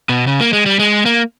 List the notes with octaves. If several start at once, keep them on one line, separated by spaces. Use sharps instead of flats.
B2
C#3
A#3
G#3
G3
G#3
A#3